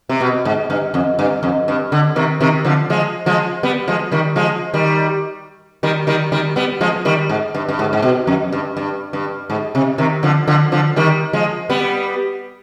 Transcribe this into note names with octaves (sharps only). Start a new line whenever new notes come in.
C3
B2
G#2
G2
F2
G2
F2
G2
D3
C3 D#3
C3 D#3
D3 F3
F3 G#3
F3 G#3
G3 B3
F3 G#3
D#3 G3
F3 G#3
D#3 G3
D#3 G3
D#3 G3
D#3 G3
G3 B3
F3 G#3
D#3 G3
G#2
G2
G2
G#2
G#2
B2
F2
G2
G2
G2
G#2
C3
C3 D#3
D3 F3
D3 F3
D3 F3
D#3 G3
F3 G#3
G3 B3